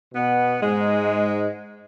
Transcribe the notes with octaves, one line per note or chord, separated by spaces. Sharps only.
B2 B3
G#2 G#3